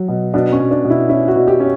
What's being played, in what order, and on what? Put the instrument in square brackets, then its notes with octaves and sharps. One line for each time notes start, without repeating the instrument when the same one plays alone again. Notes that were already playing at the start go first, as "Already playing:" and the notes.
Already playing: [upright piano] F#3
B2
[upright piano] B2 [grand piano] D4
[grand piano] C#4
[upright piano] B2
[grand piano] D4
[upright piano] B2
[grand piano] E4
[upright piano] C#4 [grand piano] E4
[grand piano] F#4
[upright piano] B2
[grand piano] G4
[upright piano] C#4